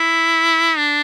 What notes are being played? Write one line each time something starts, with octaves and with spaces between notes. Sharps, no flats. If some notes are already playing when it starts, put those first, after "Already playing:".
Already playing: E4
D4